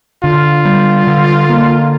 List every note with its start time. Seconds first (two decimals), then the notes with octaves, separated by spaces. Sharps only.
0.24 D3 F4
0.65 G3
1.07 D3
1.49 A#3